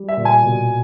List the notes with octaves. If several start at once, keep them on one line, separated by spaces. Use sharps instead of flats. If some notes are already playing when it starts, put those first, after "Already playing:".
Already playing: G3
E5
A#2
G#5
B2